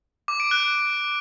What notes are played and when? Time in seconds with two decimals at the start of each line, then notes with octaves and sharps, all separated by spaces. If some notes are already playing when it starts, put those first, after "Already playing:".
0.28 D6
0.40 D7
0.51 F#6